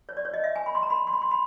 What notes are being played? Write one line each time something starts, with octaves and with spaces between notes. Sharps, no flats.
C#5
D5
C#5
D#5
E5
G#5
B5
C6
A#5
B5
C6
B5
C6
B5